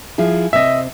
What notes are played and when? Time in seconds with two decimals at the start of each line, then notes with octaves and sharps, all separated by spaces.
0.18 F3 E4 G#4
0.53 C3 C4 D#5 E5